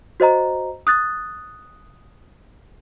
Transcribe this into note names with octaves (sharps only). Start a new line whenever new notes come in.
F#4 C5 D#5 A#5
D#6 F#6 A6